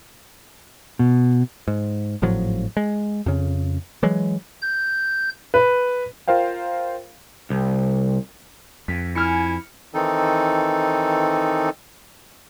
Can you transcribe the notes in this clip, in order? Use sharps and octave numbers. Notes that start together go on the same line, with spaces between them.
B2
G#2
G#1 A2 F3 F#3
G#3
F2 C#3
E3 F#3 G#3
G6
B4
F4 A#4 C5 F5 G5
C2
F2 B6
E4 G#5 F6 C#7
D#3 E3 C4 D#4 A4